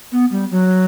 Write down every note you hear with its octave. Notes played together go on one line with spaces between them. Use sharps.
B3
G3
F#3